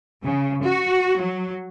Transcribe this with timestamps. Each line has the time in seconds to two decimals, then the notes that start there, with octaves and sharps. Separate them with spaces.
0.24 C#3
0.62 F#4
1.20 F#3